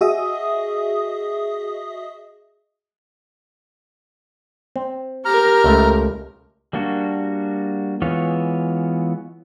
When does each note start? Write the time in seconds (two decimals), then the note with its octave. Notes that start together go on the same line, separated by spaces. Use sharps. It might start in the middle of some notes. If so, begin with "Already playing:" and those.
0.01 F#4 G#4 D#5 E5 D#6
4.76 C4
5.25 G4 A#4 A#5 F6
5.64 C#2 A3
6.73 G3 A#3 D4 F#4
8.02 E3 G#3 B3 F4 C#5